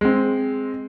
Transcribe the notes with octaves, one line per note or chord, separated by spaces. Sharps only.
G#3 C4